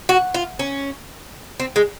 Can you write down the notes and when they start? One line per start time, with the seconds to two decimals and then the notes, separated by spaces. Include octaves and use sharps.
0.09 F#4
0.34 F4
0.59 C#4
1.60 C4
1.76 G#3